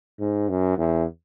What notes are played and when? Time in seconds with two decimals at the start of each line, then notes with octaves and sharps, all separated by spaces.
0.20 G#2
0.49 F#2
0.78 E2